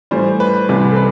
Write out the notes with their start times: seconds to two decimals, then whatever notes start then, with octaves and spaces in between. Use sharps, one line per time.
0.11 A2 E3 G3 C5
0.40 B4
0.69 C2 C3 E3 G3
0.91 A4
0.96 B4